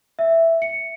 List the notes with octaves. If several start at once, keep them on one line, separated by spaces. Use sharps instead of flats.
E5
C#7